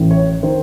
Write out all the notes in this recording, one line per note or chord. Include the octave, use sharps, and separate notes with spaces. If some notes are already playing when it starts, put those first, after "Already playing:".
Already playing: A1 A2 E3
C#5
D#3 C5